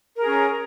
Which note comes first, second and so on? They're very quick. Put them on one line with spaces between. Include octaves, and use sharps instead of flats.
A#4 G#4 C#4